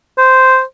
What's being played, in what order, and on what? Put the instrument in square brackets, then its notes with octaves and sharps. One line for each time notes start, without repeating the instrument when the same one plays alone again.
[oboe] C5